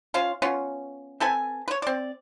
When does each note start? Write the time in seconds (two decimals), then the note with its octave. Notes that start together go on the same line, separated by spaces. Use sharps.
0.14 C#4 F4 C5 F5
0.42 B3 C#4 F4
1.20 C4 A4 B4 G#5
1.68 B4 C#5
1.82 C4 D5